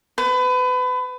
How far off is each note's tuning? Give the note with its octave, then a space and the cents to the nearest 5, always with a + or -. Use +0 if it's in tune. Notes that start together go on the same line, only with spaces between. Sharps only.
B4 +30